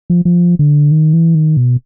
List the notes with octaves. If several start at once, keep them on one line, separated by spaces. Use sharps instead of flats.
F3
F3
D3
D#3
E3
D#3
B2